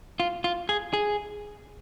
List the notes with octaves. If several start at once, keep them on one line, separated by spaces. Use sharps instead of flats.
F4
F4
G#4
G#4